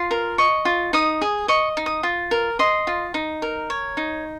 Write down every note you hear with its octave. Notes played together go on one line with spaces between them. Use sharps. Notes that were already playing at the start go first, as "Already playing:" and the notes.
Already playing: F4 C6
A#4
D#5 C#6
F4
D#4 D#6
G#4
D#5 C#6
D#4
D#6
F4
A#4
D#5 C6
F4
D#4
A#4
C#5
D#4